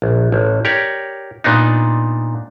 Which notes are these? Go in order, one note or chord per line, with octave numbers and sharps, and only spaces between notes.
A#1
A1
G4 A#4 C#5 D5
A#2 B3 D4 D#4